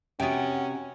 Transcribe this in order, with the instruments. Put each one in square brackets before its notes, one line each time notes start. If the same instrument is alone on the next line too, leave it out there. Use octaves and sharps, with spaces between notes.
[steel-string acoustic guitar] C3 F#4 [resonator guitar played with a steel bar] B3 G5 [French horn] C#4